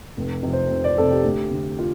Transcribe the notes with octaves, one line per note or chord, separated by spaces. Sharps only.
F1
F2 C3
C5
F1
D5
F2 C3 A4
G4
D2
D3
F4